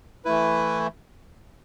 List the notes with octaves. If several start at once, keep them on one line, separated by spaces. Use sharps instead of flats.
E3 A3 E4 B4